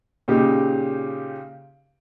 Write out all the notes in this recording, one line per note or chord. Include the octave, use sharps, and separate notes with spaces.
A#2 C#3 D#4 G4